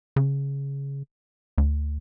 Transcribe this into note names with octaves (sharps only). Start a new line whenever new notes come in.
C#3
D2